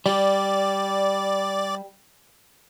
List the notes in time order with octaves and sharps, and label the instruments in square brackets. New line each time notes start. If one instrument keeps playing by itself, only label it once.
[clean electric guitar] G3 [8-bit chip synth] D5